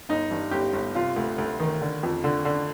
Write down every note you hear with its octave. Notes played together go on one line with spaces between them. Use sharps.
G1 D#4
G2
G1 G4
G1
C3 F4
D2
D2
D#3
D3
F2
D3
D3